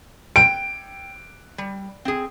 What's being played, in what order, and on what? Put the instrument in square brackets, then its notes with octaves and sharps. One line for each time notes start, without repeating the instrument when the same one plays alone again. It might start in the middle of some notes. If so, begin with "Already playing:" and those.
[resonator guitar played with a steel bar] G5 [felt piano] D7
[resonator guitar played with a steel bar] G3
C4 G#4